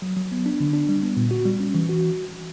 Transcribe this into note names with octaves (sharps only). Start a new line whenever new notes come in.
F#3
F#3
B3
D4
D3
D4
G3
B3
A#2
F#4
G3
C#4
E3
F#4